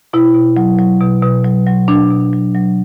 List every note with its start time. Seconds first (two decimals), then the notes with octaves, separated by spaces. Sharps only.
0.13 B2 E4
0.35 B2
0.57 F#3
0.79 F#3
1.01 B2
1.23 B2
1.44 F#3
1.67 F#3
1.88 B2 D4
2.11 B2
2.33 F#3
2.55 F#3